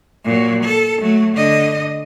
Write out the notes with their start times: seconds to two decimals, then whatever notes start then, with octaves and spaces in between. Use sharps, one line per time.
0.24 A#2 F#3
0.64 A4
1.02 F#3 A3
1.35 D3 D#5